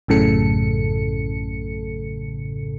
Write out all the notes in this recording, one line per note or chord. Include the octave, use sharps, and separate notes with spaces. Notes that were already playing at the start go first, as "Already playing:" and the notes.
A1 F#2 A2 C#3 A4 C#7